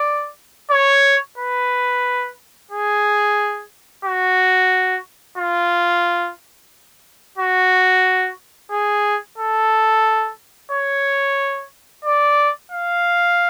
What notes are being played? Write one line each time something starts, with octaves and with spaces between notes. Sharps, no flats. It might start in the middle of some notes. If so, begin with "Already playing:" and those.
Already playing: D5
C#5
B4
G#4
F#4
F4
F#4
G#4
A4
C#5
D5
F5